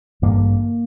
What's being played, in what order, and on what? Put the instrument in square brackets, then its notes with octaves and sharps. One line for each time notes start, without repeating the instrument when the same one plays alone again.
[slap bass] A1 G2 D3 A#3